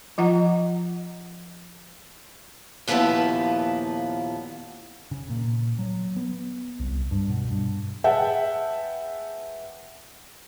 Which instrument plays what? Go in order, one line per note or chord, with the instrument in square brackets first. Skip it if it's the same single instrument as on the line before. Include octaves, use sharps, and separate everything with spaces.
[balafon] F3 F4 D#5 F#5 A#5
[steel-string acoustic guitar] D#2 A#2 F3 B3 E4 A5
[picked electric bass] C#3
A#2
F#3
B3
C2
G2
B2
G2
[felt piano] G#4 B4 E5 F#5 G5 A5